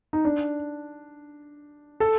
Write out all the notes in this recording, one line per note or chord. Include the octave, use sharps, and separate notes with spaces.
D#4
D4
A4